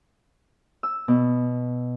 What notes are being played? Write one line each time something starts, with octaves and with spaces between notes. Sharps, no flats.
E6
B2